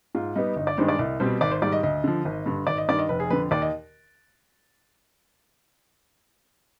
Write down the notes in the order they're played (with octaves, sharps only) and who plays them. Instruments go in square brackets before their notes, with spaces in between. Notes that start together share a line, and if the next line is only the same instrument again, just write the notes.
[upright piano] G#2 F4
G3 B3 D#4
G1 D#4
D5
G2 D#3 G#3 D4 C5
D5
C2 D#5
B2 G3 C4 C5
G#1 D5
C5
G#2 D#3 G3 D5
D#5
D2 D#5
D3 F3
G#1
G2 D3
G#1 D5
D#5
G2 D#3 D5
D#5
F1 B4
G#4
F2 D3 B4
D#2 D5
D#5